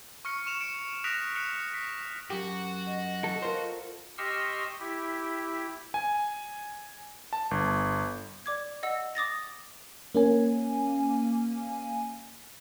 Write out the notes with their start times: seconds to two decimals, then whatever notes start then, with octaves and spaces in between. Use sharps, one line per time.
0.25 C#6 F6 C#7
0.46 C#6 E7 F7
0.61 C#7 D7 E7
1.04 D#6 F#6 A#6 B6 D7 F7
1.35 F6 F#6 C#7
1.74 B6
2.30 F#2 F#4 G4
2.86 D#5
3.24 A4
3.42 F4 A#4 C5
4.18 G4 D#5 C6 C#6 E6 F6
4.80 E4 G4
5.94 G#5
7.33 A5
7.51 G1
8.46 D5 D6 G#6
8.83 D#5 F#5 E6
9.15 D6 D#6 A6 A#6
10.15 A#3 C#4 G#5